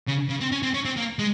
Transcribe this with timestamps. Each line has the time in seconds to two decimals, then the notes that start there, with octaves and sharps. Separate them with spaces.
0.07 C#3
0.29 C#3
0.41 C4
0.52 C#4
0.63 C4
0.74 C#4
0.85 C4
0.97 A#3
1.19 G#3